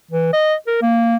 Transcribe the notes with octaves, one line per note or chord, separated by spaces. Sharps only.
E3
D#5
A#4
A#3